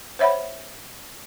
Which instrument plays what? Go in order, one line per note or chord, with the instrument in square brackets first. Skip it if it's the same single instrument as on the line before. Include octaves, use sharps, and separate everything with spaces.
[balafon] C5 C#5 E5 F#5 B5